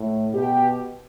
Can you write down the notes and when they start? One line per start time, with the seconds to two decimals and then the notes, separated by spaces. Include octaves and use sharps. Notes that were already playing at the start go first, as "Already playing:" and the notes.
Already playing: A2
0.34 B2 G4